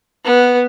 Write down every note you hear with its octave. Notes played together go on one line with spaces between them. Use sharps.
B3